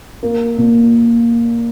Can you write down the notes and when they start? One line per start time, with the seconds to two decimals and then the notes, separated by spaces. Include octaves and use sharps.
0.23 A#3
0.58 A#2